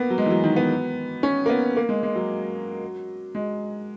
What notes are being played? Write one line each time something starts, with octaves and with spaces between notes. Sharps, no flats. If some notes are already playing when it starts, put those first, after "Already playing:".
Already playing: A#3 B3
F#3
G#3
E3
F#3
D#3
B3
C#4
A#3
B3
A#3
G#3
G#3
F#3
G#3